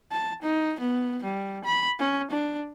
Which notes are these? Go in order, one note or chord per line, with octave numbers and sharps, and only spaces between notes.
A5
D#4
B3
G3
B5
C#4
D4